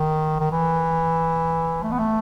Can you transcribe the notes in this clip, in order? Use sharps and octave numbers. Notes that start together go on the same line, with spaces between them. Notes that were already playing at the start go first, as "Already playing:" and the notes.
Already playing: D#3
D#3
E3
A3
B3
A3